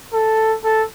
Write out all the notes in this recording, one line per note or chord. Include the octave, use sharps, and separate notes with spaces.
A4
A4